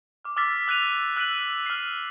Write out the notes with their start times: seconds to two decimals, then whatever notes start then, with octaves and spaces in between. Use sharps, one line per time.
0.25 D6 F6
0.37 D6 E6 F6 A6 B6
0.68 E6 F#6 A6 D#7 F7
1.16 E6 F#6 B6 D#7 F#7
1.66 F6 C7